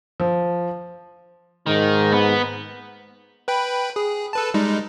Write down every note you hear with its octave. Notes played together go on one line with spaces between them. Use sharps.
F3
G#2 D#3
B3
B4 G5 B5
G#4
A4 B4 A5
G3 G#3 D#4